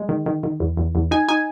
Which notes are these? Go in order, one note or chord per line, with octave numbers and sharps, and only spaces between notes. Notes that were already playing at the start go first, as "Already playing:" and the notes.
Already playing: G#3
D#3
D#3
D#3
E2
E2
E2
D#4 G#5
D#4 G#5